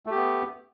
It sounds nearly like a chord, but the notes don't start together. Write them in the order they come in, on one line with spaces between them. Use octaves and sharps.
A3 G4 B3